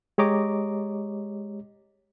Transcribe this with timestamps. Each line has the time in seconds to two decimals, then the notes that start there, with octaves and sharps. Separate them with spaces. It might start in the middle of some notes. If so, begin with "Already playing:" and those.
0.18 G#3 G4 C#5 D#5 A#5 D6